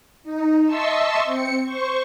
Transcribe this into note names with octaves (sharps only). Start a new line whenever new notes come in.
D#4
D#5 E5 A5 C6 C#6 E6
C4 C#7
C5 C#6